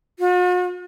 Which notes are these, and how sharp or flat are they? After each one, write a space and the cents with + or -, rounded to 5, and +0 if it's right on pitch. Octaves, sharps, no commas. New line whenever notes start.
F#4 -45